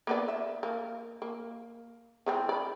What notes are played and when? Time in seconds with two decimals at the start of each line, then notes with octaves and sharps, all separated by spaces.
0.07 A#3 B3 D5
0.28 E5
0.63 A#3
1.22 A#3
2.26 E3 G#3 C4
2.49 D5 B5